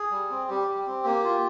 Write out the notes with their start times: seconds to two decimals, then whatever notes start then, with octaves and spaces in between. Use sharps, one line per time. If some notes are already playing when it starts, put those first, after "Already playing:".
Already playing: G#4
0.11 G3
0.30 C4
0.49 G3 G4
0.68 G3
0.86 C4
1.05 A#3
1.24 F4